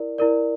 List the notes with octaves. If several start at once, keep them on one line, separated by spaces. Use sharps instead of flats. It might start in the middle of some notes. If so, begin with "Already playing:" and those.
Already playing: E4 A#4 D5
E4 A#4 D5